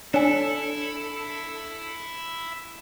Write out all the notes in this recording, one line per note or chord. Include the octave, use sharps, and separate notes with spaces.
D4 E4 A4 C#5 G#5